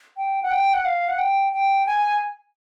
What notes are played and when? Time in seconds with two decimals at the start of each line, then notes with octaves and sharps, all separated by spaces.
0.17 G5
0.43 F#5
0.51 G5
0.74 F#5
0.85 F5
1.08 F#5
1.18 G5
1.53 G5
1.86 G#5